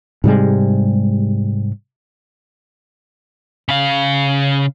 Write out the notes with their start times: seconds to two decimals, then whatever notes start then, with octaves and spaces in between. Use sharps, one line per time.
0.24 G#2 C3 G3 G#3
3.69 C#3 F5